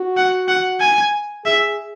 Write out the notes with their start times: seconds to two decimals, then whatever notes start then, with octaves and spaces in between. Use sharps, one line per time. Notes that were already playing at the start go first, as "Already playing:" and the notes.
Already playing: F#4
0.17 F#5
0.48 F#5
0.80 G#5
1.45 G#4 E5